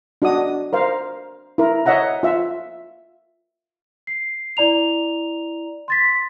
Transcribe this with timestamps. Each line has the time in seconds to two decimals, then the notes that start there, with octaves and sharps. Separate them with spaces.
0.22 D4 F#4 D#5 D#6
0.73 A#4 C5 F5
1.58 E4 A#4
1.86 C#5 D#5 E5 F#5 A#5
2.23 F4 E5
4.07 C7
4.57 E4 D5 A#5 F7
5.88 C6 A6 B6